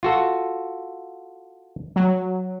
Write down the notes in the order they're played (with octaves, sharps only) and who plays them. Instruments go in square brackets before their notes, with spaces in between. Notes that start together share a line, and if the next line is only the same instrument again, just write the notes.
[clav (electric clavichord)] F4 F#4 A4
[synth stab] F#3